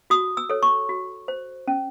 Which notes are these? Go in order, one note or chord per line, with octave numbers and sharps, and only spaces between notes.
F#4 D#6
E6
A4 C#5
C#6
F#4
C5
C#4